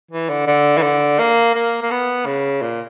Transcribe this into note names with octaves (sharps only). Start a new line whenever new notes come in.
E3
D3
D3
E3
D3
A#3
A#3
A#3
B3
C#3
A#2